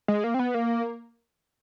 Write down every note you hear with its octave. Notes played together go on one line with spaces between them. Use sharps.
G#3
A#3
C4
B3
A#3